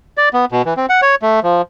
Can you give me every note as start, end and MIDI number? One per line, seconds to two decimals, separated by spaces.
0.18 0.29 74
0.34 0.45 59
0.52 0.62 47
0.65 0.74 52
0.77 0.86 60
0.89 1.01 78
1.02 1.15 73
1.22 1.40 57
1.43 1.62 53